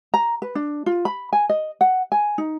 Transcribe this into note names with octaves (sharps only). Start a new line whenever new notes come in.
A#5
B4
D4
F4
B5
G#5
D#5
F#5
G#5
D#4